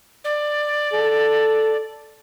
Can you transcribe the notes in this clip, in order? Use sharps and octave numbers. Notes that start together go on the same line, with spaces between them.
D5
A4